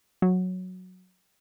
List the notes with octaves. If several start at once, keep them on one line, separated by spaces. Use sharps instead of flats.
F#3